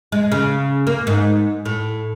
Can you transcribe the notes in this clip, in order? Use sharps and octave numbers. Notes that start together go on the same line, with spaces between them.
G#3
C#3
A#3
G#2
A2